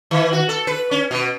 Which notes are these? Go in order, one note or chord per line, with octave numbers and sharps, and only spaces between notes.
D#3
F#4
A4
B4
C#4
B2